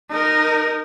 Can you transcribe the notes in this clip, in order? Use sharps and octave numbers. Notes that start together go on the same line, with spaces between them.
D#4 A#4